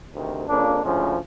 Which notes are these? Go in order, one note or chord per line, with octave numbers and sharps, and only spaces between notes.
D2 C3 D#3
F2 C#3 F3 A#3 D4
D2 C#3 F3 G#3 C#4